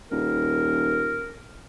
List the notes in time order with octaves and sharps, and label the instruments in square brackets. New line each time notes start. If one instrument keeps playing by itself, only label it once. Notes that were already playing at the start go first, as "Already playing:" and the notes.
[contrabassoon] D#1 [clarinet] A#4